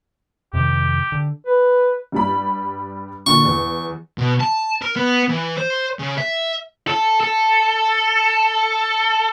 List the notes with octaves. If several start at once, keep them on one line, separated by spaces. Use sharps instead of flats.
F2 C3 D#3 G4
D3
B4
G2 G3 B5
A#2 D3 C#6
E2
B2
A5
A#4
B3
E3
C5
C#3
E5
A4
A4